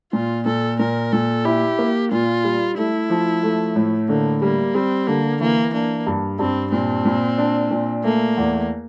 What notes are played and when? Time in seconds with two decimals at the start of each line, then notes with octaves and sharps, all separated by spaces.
0.13 A#2 F4
0.46 A#2 A4
0.80 A#2 A#4
1.13 A#2 A4
1.45 E4 G4
1.79 A#3
2.11 A#2 F4
2.44 G3
2.77 A3 E4
3.10 F3
3.43 A3
3.76 A2
4.09 D3 A#3
4.42 G3 A#3
4.74 G3 C4
5.07 D3 A#3
5.41 E3 A#3
5.74 A#3 D4
6.07 G2
6.39 G2 C4
6.72 A#2 C4
7.05 A#2
7.38 D4
7.71 A#2
8.05 A3 A#3
8.38 E2